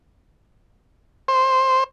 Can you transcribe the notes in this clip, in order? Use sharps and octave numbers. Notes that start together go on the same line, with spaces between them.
C5